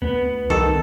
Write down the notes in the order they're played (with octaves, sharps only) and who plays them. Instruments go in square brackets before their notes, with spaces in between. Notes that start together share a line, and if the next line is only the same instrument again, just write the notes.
[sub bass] D2 [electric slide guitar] B3
[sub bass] C2 [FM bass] D#3 [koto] A4